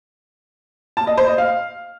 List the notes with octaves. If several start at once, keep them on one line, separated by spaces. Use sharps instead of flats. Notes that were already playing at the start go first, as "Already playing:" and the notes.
A5
D#5
C5
D#5
F5